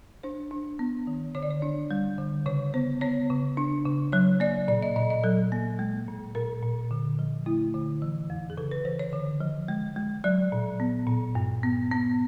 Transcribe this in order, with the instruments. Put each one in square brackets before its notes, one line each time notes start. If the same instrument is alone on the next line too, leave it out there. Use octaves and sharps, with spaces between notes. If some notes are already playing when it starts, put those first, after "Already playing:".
[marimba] D4 C5
D4
B3
D#3
D3 C#5
D5
C#5
D4
G3
D3
C#3 C#5
B3 C5
B3 C#5
C#3
D4
C#3
F#3 C#5
A#3 D5
A#2 D5
D#5
A#2 D#5
D#5
F#3 A4
A#3
G#3
A#2
A#2 A#4
A#2
D3
F3
A3 E4
D3
E3
F2
G#4
C#3 A4
B4
E3 C5
C#5
D3
F3
G#3
G#3
F#3 D5
A#2
B3
A#2
G2
B3
B3